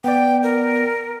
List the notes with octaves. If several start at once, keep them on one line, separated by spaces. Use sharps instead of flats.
B3 D5 G5
A#4